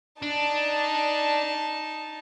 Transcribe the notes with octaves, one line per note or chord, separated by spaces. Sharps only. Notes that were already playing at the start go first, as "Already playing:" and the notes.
D4 D#4 A5